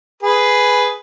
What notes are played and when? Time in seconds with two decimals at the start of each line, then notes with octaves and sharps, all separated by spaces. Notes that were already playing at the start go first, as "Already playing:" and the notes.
0.23 G#4 B4